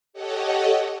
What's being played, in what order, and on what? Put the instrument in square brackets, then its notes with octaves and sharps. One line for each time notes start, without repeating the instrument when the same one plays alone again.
[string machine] G4 A4 C#5 D#5 F#5